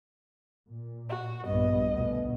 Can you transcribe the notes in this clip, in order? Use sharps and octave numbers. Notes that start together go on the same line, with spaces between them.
A#2
F#4
A#1 G2 B3 D#5
D2 B2